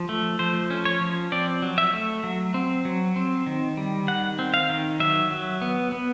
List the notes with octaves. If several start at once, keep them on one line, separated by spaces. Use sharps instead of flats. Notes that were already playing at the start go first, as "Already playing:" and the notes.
Already playing: F3
A3
F3 C5
C#4
C#5
F3
C4 D5
F#3
E5
A3
F#3
C4
F#3
C4
D#3
G3
D#3 F#5
C4
F5
D#3
F#3 E5
F#3
B3
B3